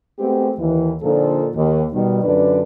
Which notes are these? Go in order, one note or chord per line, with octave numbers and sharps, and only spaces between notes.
G#3 A3 B3 C4 G4
D#2 E3
A#2 D3 F3 D#4 A4
D#2
B2 D#3 G3
F#2 D3 D4 F4 B4 D5